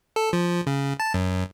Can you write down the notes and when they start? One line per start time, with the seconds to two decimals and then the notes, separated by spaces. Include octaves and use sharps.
0.16 A4
0.33 F3
0.67 C#3
1.00 A5
1.14 F#2